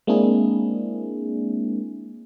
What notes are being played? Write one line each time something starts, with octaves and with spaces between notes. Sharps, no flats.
G#3 A#3 C4 D4 E4 G#4